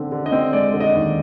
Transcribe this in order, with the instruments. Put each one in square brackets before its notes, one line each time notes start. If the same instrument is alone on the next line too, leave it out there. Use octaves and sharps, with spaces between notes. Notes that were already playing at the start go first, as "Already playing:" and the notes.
Already playing: [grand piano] D3 C4
D3
D#5
C4
G#3 D5
D3
D#5
D#2